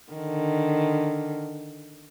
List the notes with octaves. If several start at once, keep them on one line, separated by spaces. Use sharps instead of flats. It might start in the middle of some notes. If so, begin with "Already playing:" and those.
D3 D#3